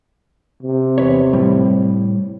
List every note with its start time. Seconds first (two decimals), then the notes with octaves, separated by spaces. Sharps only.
0.63 C3
0.98 E2 B4 C#5
1.33 A2 G3